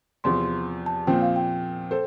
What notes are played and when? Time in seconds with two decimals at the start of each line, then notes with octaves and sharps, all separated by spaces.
0.24 E2 C3 F3 C6
0.86 A5
1.07 A#2 F3 C4 G5
1.22 F5
1.36 G5
1.91 A4 C5